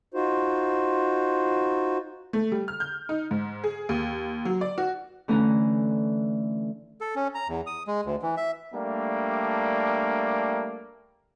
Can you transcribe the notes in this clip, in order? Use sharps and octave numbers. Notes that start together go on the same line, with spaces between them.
D#4 F4 F#4 C5
A3
G3
F6
G6
D#4
G#2
G#4
D#2
F#3
D5
F#4
D3 E3 A3 C#4 A#5
A4
C#4
A#5
E2
D#6
G#3
D2
E3
E5
G3 A3 A#3 D4